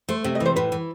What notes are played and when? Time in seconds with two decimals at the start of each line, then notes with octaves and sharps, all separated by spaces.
0.09 A3 C5
0.24 C3 E5
0.35 D#5
0.40 E3
0.45 C5
0.56 A2 B4
0.72 E3